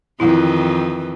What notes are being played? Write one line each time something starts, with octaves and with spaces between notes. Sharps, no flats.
F2 D#3 E3 E4